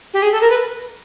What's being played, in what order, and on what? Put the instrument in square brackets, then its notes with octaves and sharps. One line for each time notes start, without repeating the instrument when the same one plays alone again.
[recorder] G4
G#4
A4
A#4
B4